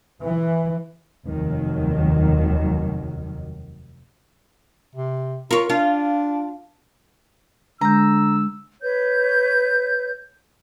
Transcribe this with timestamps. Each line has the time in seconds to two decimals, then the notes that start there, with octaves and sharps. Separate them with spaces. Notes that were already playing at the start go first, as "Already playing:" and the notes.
0.21 E3
1.25 F1 D#2 D#3 F#3
4.95 C3
5.51 F4 A#4 C#5
5.70 D4 F4
7.81 D3 G#3 A#5 E6 G6
8.82 B4 C#5 G6